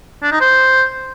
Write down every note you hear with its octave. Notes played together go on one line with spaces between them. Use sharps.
D4
D#4
C5